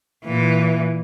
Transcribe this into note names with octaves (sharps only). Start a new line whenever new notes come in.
A#2 E3